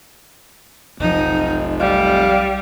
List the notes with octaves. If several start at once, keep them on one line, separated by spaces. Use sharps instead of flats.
F1 B1 F3 D#4
G3 F5